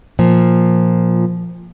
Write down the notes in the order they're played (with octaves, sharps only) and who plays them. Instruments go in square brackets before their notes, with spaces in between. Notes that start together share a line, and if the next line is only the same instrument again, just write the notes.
[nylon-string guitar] A#2 F3